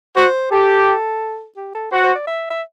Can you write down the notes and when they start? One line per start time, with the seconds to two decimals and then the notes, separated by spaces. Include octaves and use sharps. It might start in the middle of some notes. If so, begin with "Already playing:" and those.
0.16 F#4 C5
0.52 G4 A4
1.57 G4
1.75 A4
1.92 F#4 C5
2.04 C5
2.15 D5
2.27 E5
2.50 E5